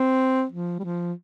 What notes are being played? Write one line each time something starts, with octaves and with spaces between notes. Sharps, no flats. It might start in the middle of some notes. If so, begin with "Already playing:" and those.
Already playing: C4
F3
G3
F3